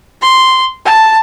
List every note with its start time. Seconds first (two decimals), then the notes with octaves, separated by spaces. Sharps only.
0.21 C6
0.85 A5